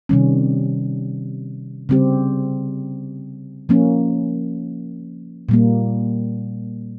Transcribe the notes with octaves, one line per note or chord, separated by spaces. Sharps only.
C3 D#3 G3 C#4
C#3 G3 C4 G4
F3 A#3 C#4
A#2 G3 A#3